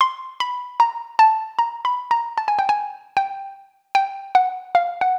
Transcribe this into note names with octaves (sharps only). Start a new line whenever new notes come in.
C6
B5
A#5
A5
A#5
B5
A#5
A5
G#5
G5
G#5
G5
G5
F#5
F5
F#5